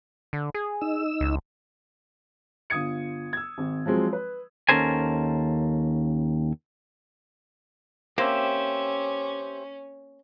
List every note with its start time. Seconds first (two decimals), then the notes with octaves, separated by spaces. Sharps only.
0.33 D3
0.55 G#4
0.81 D#4 E6
1.21 C#2
2.70 G1 F4 D#6 G#6 C#7
3.33 E6 G#6
3.58 G#1
3.86 F3 F#3 G#3 C4
4.13 B4
4.69 D#2 C#4 A4 A#4 C5 G#5
8.18 A#3 C4 C#4 G4 C5 E5